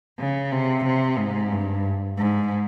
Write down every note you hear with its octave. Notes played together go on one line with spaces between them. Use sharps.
C#3
C3
C3
G#2
G2
G#2